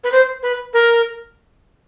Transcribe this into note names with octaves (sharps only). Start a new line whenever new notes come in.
B4
C5
B4
A#4